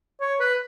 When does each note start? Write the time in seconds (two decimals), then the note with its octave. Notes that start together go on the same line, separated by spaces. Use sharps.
0.20 C#5
0.40 B4